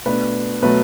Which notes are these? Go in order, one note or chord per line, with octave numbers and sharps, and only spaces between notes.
B2 A3 D4 B4
B2 F#3 A3 B4